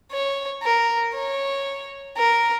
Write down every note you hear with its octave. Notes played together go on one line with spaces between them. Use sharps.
C#5
A#4
C#5
A#4